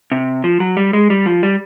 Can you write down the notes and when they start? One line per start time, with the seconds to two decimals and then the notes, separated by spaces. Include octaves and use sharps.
0.12 C3
0.44 F3
0.60 F#3
0.77 G3
0.93 G#3
1.10 G3
1.26 F3
1.43 G3